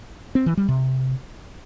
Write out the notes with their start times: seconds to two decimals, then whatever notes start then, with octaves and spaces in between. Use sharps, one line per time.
0.35 C4
0.46 E3
0.57 G3
0.69 C3